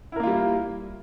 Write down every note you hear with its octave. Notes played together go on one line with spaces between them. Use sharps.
G3 A#3 E4 F4 A#4